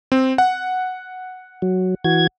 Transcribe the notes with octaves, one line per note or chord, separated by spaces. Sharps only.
C4
F#5
F#3
E3 F#4 G#6